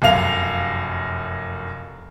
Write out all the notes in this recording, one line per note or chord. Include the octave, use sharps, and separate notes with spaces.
F1 F#2 F5 F7